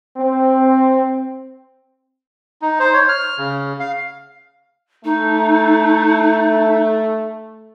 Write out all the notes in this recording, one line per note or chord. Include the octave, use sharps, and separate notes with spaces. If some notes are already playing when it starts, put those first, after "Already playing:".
C4
D#4
C5
C#5
F6
C#3
F5
A3 D#4